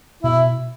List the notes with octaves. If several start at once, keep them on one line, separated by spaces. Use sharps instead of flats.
B2 E4